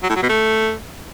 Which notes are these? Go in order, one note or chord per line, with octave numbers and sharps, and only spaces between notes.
F#3
A2
F#3
B2
A3